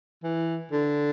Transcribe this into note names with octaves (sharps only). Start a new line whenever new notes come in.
E3
D3